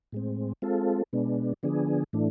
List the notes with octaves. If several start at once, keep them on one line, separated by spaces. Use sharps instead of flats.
A2 G#3 C4
G#3 C4 F4 A4
B2 G#3 B3 D4
D3 F3 B3 D4 G#4
A2 E3 A3 D4